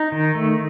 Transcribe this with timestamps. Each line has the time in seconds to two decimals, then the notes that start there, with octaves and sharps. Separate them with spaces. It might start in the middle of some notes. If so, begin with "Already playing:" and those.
Already playing: D#4
0.12 D#3
0.35 A3